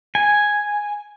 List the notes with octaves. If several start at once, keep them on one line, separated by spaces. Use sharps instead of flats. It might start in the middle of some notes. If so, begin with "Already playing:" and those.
G#5